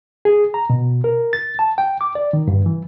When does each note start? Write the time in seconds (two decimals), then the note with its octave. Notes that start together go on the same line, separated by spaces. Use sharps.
0.25 G#4
0.54 A#5
0.70 B2
1.04 A#4
1.33 A6
1.59 A5
1.78 G5
2.01 D6
2.15 D5
2.33 D#3
2.48 G2
2.66 E3